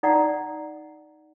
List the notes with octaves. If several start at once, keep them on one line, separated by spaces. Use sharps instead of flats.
D#4 D5 F#5 A#5